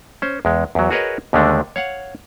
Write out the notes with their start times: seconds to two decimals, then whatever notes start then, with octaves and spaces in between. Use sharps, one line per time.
0.22 C#4 C5
0.45 E2 G#3
0.75 E2 F#3
0.91 F#4 G#4 A#4 B4 C#5 D#5
1.33 D#2 D3 G#3 A3 D4
1.76 C#5 F5 F#5